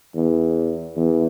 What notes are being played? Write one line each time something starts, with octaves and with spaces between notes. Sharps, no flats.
E2
E2